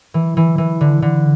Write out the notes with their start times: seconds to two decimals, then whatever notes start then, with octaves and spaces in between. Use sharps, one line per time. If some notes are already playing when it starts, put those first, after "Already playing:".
0.14 E3
0.37 E3
0.58 E3
0.81 D3
1.02 D3